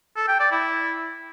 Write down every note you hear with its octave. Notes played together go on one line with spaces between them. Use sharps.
A4
G5
D5
E4